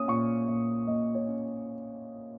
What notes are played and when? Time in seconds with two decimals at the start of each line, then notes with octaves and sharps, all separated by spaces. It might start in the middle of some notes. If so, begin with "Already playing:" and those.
Already playing: A#3 C#4 D#6
0.08 A#2 C#6
0.48 A#2
0.87 A#3 D#5
1.15 C#5
1.28 C#4